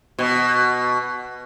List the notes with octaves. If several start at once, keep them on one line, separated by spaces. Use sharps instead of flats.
B2